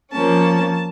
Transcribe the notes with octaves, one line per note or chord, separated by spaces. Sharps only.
F3 A#3 C#4 A5